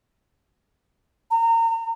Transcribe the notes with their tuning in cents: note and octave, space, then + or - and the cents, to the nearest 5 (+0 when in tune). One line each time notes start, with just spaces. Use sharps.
A#5 -30